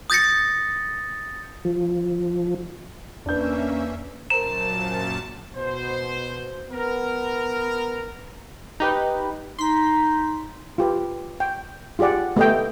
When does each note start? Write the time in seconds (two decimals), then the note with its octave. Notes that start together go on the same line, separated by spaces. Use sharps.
0.10 D#6 G6 A6 A#6 C#7
1.65 F3
3.26 E2 A#3 C#4 D4 B4 E5 G6
4.30 F#2 A#2 A#4 C5 A5 A#5 E7
5.55 B2 C5
6.71 B3 A#4
8.80 D#4 G4 B4
9.59 D#4 C6 B6
10.78 F4 G4 B4
11.40 G5
11.99 F4 G4 G#4 D5 F#5
12.36 A3 B3 G4 D#5 E5 G5